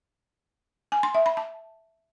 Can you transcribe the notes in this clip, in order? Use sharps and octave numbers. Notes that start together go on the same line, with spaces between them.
G#5
C6
E5
B5
A5